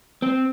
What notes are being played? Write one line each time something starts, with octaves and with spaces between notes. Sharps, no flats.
C4